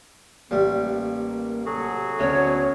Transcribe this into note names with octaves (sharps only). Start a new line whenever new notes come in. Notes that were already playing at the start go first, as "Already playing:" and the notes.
A1 G3 A#3
C3 F#3 F#4 G#4 A4
D2 B3 C#4 C#5